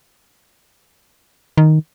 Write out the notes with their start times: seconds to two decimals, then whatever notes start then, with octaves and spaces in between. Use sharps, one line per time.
1.58 D#3